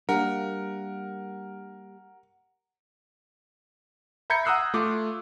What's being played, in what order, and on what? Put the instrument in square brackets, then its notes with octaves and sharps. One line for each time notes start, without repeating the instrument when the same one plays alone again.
[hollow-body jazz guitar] G3 A#3 [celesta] D4 [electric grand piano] A#4 [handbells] F#5
[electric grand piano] E5 A#5 B5 G6 G#6 C#7
F#5 A#5 D#6 E6 F#6 C7
A3 F4 D6